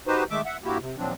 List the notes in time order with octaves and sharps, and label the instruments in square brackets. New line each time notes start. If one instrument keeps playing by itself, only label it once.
[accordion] D#4 F#4 G4 B4 C5
D#3 G#3 A3 E5 D6
E5 F#5
G2 A#3 E4 F#4 G4
C3
D#2 A#2 F3 F#3 C4 D4